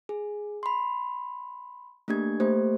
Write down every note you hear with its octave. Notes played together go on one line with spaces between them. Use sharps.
G#4
B5 C6
A3 A#3 D4 G4 G#6
A3 A#3 G4 C5